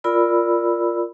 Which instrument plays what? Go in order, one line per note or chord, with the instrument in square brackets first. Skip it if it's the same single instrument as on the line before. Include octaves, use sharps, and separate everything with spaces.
[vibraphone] F4 A#4 D5 B5 E6